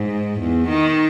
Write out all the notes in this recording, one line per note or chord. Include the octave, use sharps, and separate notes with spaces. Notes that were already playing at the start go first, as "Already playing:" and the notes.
Already playing: G#2
E2
D#3